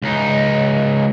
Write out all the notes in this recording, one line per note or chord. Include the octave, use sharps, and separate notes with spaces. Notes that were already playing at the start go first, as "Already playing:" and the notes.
C#2 D#4